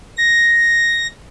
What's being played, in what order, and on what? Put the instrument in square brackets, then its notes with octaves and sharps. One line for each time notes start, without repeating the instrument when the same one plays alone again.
[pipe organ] A#6